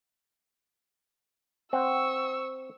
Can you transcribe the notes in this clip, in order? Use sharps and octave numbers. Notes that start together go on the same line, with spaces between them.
C4 F#5 C#6 E6